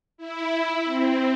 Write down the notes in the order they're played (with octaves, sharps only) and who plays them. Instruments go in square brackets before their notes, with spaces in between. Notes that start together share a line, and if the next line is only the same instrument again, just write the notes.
[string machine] E4
C4